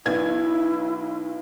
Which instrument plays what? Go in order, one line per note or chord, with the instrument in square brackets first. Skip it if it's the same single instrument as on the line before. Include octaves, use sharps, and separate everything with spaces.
[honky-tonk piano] B1 B3 G#6 [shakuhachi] E4